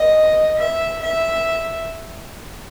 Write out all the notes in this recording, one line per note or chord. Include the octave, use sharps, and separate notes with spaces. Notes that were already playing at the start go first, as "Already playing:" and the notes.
Already playing: D#5
E5
E5